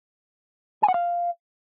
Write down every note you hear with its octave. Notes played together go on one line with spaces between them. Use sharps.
G#5
F#5
F5